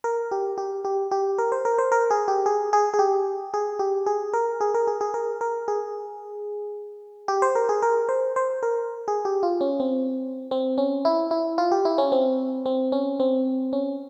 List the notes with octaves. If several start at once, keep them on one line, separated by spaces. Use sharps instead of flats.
A#4
G4
G4
G4
G4
A#4
C5
A#4
C5
A#4
G#4
G4
G#4
G#4
G#4
G4
G#4
G4
G#4
A#4
G#4
A#4
G#4
G#4
A#4
A#4
G#4
G4
C5
A#4
G#4
A#4
C5
C5
A#4
G#4
G4
F4
C#4
C4
C4
C#4
E4
E4
F4
G4
E4
C#4
C4
C4
C#4
C4
C#4